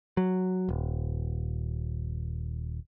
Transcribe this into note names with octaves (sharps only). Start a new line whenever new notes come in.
F#3
D#1